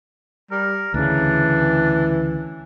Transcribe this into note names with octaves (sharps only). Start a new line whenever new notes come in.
G3 A#4
D2 C#3 E3 D4